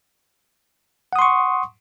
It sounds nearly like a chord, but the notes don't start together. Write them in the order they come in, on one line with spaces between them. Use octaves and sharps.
F#5 D#6 C6 C#6